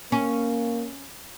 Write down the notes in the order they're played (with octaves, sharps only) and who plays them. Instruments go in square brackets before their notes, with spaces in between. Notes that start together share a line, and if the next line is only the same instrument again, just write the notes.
[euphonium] A#3 [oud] C#4